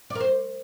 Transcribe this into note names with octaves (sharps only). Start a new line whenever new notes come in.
D5
A#4
C5